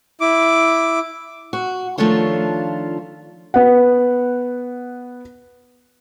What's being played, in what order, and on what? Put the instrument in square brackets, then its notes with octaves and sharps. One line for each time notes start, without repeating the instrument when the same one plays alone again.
[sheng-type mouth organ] E4 D6
[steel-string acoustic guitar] F#4
D#3 F3 A3 D4 F4 C#5
[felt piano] B3 F#5